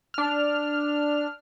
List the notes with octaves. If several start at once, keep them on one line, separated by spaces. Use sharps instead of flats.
D4 F6